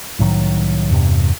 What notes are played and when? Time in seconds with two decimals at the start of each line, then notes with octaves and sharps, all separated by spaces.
0.19 C2 A2 D#3 F#3
0.91 E2 G2 C3